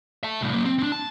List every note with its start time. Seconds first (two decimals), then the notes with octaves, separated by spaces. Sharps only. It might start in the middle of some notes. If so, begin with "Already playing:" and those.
0.23 E5 A5
0.41 C2 A2
0.54 F#3 A#3
0.65 C4
0.79 C4 D4
0.92 A5